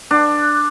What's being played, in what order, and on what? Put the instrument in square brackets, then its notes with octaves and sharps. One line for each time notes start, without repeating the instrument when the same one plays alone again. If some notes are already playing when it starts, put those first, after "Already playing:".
[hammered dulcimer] D4